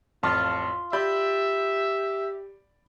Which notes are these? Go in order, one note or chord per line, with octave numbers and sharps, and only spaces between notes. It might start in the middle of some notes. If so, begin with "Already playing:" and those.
A1 F2 F4 A5
G4 D5 E5 B5 G6